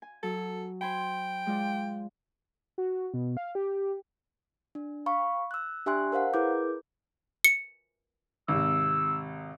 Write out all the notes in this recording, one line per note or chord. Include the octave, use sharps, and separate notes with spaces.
G#5
F#3 A4
C5 G5 G#5 B5
G#3 F4 D5
F#4
B2
F5
G4
D4
F5 B5 C#6
E6 F#6
D4 G4 E5 G#5 C6 F#6
A#4 C5 F5 F#5
E4 G#4 A#4 B4 D6 G6
C#7
G#1 C3 E6